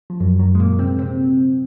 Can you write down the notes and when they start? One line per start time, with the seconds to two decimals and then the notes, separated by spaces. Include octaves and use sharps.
0.10 F3
0.20 F#2 F#3
0.39 F#2 F#3
0.55 G#3
0.59 A#2 A#3
0.79 C3 C4
0.99 C3 C4